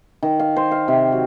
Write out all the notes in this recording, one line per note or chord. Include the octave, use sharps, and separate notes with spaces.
D#3
F5
C5
F5
C3
F#3